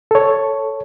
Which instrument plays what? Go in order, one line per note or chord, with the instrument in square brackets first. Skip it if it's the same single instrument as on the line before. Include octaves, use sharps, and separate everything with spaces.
[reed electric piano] A4 C#5